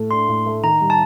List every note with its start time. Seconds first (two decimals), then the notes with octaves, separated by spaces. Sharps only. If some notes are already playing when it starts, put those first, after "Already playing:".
Already playing: A2 A3 A4
0.11 D4 C6
0.28 A2
0.46 A3
0.63 D#3 A#5
0.81 G3
0.90 A5